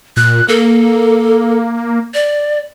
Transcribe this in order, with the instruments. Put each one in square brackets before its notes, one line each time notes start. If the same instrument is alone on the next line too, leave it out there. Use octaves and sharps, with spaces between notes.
[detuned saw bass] A#2 [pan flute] F#6
[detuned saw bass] A#3 [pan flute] A4
[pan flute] D5